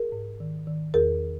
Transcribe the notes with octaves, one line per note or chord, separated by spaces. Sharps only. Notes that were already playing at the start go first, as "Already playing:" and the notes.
Already playing: G#4 A#4
G#2
D#3
D#3
E2 G#4 A#4